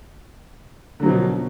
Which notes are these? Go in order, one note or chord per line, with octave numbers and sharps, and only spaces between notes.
B2 D3 F3 F#3